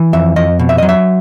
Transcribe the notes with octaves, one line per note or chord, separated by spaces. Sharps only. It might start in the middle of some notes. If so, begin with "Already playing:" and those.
Already playing: E3
F2 E5
F2 D#5
B2
E5
F#3 D#5
E5